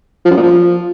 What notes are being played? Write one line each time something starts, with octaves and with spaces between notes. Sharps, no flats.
F3
F#2
A#2
F3